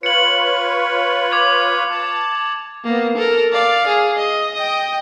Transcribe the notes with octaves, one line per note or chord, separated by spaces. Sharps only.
F4 B4 C#5 C#7 F#7
D6 G#6 F#7
A5
A#3 B3
A4 A#4
D5 F5
G#4
D#5
D#5 G5